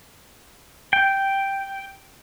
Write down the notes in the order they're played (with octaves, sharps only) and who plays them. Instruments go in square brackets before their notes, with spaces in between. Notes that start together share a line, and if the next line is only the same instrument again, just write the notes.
[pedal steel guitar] G5